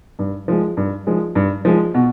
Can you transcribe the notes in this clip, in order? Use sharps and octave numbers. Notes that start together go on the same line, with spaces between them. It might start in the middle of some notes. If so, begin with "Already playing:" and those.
G2
F3 G#3
G2
F3 G#3
G2
F3 G#3
B2